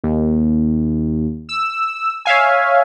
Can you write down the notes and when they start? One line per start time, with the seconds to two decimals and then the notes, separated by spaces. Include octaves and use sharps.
0.04 D#2
1.49 E6
2.25 C#5 E5 F5 G#5